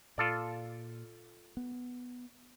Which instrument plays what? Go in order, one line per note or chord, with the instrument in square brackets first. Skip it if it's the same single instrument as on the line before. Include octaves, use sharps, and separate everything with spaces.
[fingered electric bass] A#2 [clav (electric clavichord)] F4 A4 D5
[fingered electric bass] B3